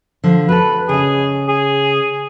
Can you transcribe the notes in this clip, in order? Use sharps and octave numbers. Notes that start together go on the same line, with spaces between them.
D3 F3
F#4 A4 B4
C#3 G#4 D#5
G#4